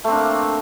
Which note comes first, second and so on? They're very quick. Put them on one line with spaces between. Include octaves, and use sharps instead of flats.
A3 C4 D4 A#3